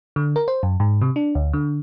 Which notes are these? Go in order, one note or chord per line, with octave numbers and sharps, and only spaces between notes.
D3
A#4
C5
F#2
G#2
C3
D4
D2
D3